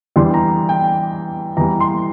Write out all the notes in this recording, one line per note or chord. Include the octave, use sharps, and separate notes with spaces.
E2 E3 G3 D4 C6
A#5
G5
E2 E3 G3 A#5
C6